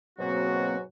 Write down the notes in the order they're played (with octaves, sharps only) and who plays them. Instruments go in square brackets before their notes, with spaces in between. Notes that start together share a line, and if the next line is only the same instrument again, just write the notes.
[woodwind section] G#2 B2 F#4 [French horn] F#3 [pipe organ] A#3 C4